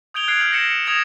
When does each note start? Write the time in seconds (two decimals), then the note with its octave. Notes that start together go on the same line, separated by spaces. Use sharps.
0.14 D#6 G6 G#6 D7 F7 G7
0.28 F6 F#6 G#6 C7 D7 F7
0.40 E6 F6 G6 B6 C7 F#7
0.51 F6 F#6 A#6 C7 C#7 E7
0.69 C#7
0.87 D#6 G#6 A#6 D7 E7 F7